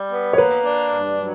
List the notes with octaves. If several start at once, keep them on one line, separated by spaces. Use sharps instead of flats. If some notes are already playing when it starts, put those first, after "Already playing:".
Already playing: G3
B3
C#5
A#3 B4
D4
G2
F#3